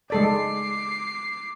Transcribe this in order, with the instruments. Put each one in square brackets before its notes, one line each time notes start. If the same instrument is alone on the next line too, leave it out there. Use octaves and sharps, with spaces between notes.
[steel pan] G#3 A4 D5 [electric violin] D6 C7